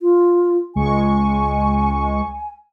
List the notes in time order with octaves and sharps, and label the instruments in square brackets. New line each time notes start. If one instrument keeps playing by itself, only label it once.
[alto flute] F4
[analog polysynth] C#2 G#3 C#6 [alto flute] G#5